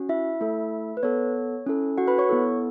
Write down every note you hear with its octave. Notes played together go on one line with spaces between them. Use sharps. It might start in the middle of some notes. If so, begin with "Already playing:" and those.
Already playing: C#4 F#4
E4 E5
A3 E4 A4
B4
B3 A4 C#5
C#4 E4 A4
F#4 F#5
B4 B5
C#5 C#6
B3 E4 A4